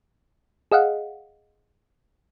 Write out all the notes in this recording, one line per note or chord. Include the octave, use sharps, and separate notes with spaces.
G#4 D#5 F5 F#5